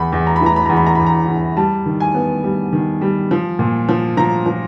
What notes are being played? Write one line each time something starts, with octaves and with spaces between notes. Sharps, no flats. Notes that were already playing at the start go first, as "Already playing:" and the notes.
Already playing: E2 B5
E2
A#5
B5
E3
A#5
B5
E2 A#5
B5
A#5
E2 B5
A#5
E2
G3 A5
D#3
G#5
B3
G3
D#3
G3
F3
A#2
F3
F3 A#5
F3